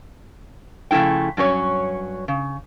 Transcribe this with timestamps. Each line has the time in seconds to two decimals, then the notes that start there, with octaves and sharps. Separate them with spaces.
0.91 C#3 F3 A3 E4 G5
1.37 G2 F#3 C#4 C#5
2.28 C#3